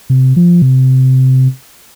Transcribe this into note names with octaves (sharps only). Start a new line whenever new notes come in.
C3
F3
C3